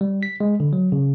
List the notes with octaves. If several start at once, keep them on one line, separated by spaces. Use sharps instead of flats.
G3
B6
G#3
D3
F#3
C#3